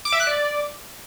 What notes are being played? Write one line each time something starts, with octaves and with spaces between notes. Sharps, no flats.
D6
E5
F#6
D5